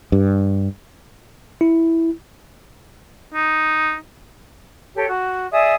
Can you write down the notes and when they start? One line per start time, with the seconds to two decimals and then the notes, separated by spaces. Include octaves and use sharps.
0.12 G2
1.61 E4
3.34 D#4
4.95 G4 A4 C#5
5.08 F#4
5.51 G#4 D5 E5 D#6